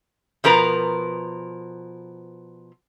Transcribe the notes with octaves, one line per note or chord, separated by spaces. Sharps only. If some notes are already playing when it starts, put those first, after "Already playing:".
B2 F3 A#4 B4 A#5